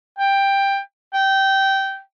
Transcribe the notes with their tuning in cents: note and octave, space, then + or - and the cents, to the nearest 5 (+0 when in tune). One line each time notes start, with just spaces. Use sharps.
G5 +10
G5 -15